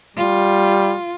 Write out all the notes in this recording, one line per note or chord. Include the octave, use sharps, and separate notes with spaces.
G3 F4